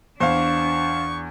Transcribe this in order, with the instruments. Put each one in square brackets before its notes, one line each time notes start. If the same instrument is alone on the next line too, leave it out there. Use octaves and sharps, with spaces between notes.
[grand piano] E2 [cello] D4 [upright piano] C5 F5 [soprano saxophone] C#6